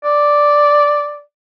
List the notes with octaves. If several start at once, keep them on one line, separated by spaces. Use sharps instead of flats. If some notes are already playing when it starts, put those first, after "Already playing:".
D5